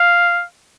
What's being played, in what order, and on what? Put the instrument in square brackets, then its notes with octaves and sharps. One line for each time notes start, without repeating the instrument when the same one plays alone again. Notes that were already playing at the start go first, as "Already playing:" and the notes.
Already playing: [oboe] F5